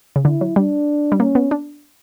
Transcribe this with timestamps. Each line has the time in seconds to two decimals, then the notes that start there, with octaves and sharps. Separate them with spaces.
0.16 C#3
0.25 D3 E4
0.41 F#3
0.56 G3 D4
1.12 G3
1.19 A#3 C#4
1.35 B3
1.51 D4